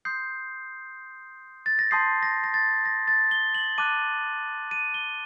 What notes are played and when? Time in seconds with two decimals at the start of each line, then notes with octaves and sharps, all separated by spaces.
0.05 C6 D#6 G6 C7
1.66 A6
1.79 A#6
1.91 A5 C6 D#6 G6 C7
2.23 A#6
2.44 A#6
2.54 A6
2.85 A#6
3.08 A6
3.31 G7
3.54 F#7
3.78 A5 D6 F#6 D#7
4.71 D#7
4.94 G7